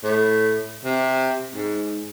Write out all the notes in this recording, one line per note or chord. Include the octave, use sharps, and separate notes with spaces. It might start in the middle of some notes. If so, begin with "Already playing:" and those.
A2
C3
G#2